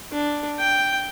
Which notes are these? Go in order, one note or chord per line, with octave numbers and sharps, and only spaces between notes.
D4
G5